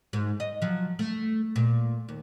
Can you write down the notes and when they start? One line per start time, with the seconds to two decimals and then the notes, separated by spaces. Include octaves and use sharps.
0.13 G#2
0.40 D#5
0.62 F3 F#3
0.99 A3
1.56 A#2
2.09 D#2